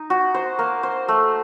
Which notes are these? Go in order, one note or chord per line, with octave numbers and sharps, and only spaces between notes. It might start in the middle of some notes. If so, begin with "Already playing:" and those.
Already playing: D#4
F#4
C5
A#3
C5
A3